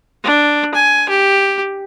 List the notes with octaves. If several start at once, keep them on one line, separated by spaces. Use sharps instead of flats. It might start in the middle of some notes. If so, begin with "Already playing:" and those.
D4
G#5
G4